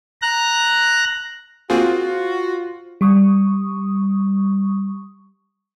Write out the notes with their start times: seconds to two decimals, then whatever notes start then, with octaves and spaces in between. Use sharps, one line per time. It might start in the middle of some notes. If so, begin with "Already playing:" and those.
0.22 A#5 F#6
1.70 A#3 C4 F4 F#4 G#4 C5
3.01 G3 C#6 D#6